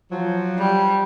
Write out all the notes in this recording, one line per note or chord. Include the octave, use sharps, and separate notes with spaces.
F3 F#3
G3